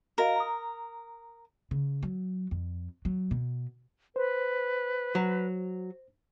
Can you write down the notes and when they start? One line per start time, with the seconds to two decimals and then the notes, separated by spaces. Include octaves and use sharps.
0.18 F#4 A#4 D#5 F5
0.36 A#5 D#6
1.71 C#3
2.03 F#3
2.51 F2
3.05 F#3
3.31 B2
4.16 B4 C5
5.15 F#3